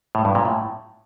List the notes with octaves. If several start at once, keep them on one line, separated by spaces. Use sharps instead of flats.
A2
G2
A#2
A2